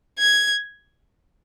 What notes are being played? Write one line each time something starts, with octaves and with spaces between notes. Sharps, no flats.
G#6